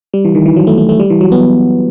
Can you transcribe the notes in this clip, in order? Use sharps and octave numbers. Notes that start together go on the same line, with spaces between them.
G3
E3
D#3
E3
F#3
A3
A3
A3
G3
E3
F#3
B3